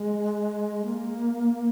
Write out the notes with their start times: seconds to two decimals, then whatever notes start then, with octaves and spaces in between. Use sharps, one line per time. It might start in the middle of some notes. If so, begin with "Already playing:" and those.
Already playing: G#3
0.84 A#3